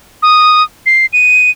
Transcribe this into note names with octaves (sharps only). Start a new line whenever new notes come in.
D#6
C7
D#7